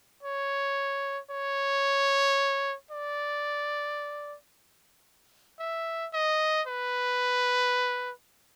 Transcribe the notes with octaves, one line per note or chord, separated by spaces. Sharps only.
C#5
C#5
D5
E5
D#5
B4